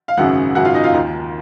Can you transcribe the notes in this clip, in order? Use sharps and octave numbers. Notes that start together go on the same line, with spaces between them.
F5
G#1 F#2 C#3 F#4 F#5
G#1 F#2 C#3 F#4 F#5
F4 F5
D#4 D#5
F4 F5
D#2 D#3